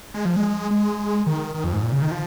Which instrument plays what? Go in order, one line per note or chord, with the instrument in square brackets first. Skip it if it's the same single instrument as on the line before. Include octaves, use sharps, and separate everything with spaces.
[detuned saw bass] G#3
F3
G#3
G#3
D#3
D#3
F2
G#2
A#2
C#3
D#3
F3